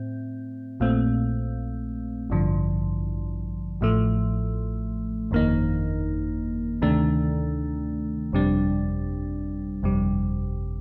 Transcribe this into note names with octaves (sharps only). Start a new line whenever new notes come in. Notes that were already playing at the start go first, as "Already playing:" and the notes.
Already playing: A2 C4
A#1 A#2 A3 C4
A1 G2 D3 F3
A1 A2 F3 A3
G1 F2 D#3 A#3 D#4
D2 C3 D#3 A3 D4
G1 F2 C3 G3 D4
G1 F2 C3 G3